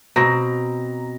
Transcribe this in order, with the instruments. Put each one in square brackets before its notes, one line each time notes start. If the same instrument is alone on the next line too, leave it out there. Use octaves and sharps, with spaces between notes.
[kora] B2 C4 [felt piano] A#5 A#6